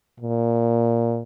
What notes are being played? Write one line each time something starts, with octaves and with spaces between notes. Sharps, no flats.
A#2